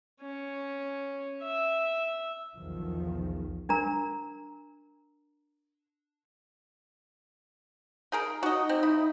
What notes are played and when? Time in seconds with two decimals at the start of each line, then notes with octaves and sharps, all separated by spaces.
0.22 C#4
1.43 E5
2.56 B1 E2 D#3 F3
3.69 D4 A#4 A#5
8.12 D#4 G#4 A#4
8.43 D#4 F#4 D#5
8.69 C4
8.83 E4